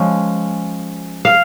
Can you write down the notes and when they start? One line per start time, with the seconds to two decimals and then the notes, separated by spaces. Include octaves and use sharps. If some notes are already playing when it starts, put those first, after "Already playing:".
Already playing: F3 G#3 C#4
1.25 F5